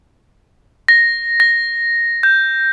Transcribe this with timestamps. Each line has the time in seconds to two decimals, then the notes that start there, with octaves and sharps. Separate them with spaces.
0.88 A#6
1.40 A#6
2.23 G6